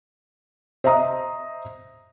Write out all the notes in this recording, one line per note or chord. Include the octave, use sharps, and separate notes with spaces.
C5 D#5 E5 A#5 D#6